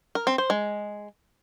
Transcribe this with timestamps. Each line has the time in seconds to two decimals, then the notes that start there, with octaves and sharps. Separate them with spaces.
0.15 A#4
0.27 C4
0.38 C5
0.50 G#3